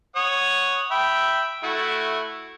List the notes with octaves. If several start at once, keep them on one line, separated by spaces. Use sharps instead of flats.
C#5 F#5 D#6
E5 G5 B5
A3 E4 F#4